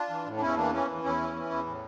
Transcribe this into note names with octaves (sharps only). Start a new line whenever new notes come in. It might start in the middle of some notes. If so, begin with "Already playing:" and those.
Already playing: D4 F4
E3
A2
D4
E2 C#4 E4
E3 A#3 D4
E3 C#4
E2
E2 C#4 E4
E3
E3
E2
A2